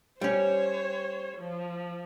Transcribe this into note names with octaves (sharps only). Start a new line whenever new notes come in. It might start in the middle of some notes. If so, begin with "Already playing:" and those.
G3 C#4 C5 C#5
F3